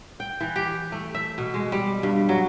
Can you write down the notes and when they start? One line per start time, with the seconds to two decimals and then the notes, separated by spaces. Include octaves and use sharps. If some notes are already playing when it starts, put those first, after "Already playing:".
0.20 G5
0.41 E3
0.56 G4
0.92 A3
1.15 E5
1.38 B2
1.54 G#3
1.72 G3
2.03 G2
2.29 F#3